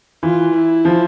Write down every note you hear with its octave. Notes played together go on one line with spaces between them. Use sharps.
E3 F4
E4
F3